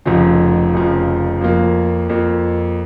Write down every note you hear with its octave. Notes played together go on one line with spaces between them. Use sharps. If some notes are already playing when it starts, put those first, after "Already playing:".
F1 F2 C#3 F3
F1 F2 C#3 F3
F2 F3 A#3
F2 F3 A#3